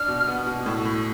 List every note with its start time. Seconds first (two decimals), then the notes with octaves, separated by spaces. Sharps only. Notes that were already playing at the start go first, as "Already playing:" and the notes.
Already playing: D4 F6
0.08 B2
0.28 B3
0.46 B2
0.66 A2
0.85 A2